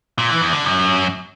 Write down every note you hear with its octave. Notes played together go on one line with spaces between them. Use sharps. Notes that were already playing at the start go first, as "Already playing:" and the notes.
A#2
E3
E2
D3
F#2